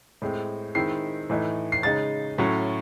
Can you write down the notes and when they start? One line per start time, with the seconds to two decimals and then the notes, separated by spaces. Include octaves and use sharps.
0.22 A2 G#3 C4
0.75 D#3 G#3 C4 E4 C7
1.30 A2 E3 A3 D#4
1.72 C7
1.83 C#3 G#3 D#4 A6
2.38 A2 F#3 C#4